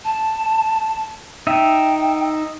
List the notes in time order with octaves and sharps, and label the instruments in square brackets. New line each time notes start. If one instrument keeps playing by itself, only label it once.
[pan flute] A5
[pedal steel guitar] D#4 E5 [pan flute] G5